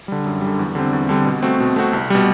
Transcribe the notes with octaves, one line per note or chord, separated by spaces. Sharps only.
D3 G3
F#2
G3
D3
E2
D3 G3 C4
E2
D3 G3 C4
B2
A3 C4 F#4
B2
A3 C4 F#4
C2
B2 G3